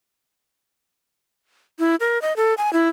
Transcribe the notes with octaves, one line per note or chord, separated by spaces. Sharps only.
E4
A#4
D#5
A4
G#5
E4